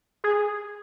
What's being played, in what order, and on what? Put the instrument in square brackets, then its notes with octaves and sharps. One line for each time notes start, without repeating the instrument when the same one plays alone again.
[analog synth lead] G#4